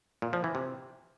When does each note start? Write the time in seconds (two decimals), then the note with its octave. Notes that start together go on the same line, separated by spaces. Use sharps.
0.22 A#2
0.33 F3
0.44 E3
0.55 C3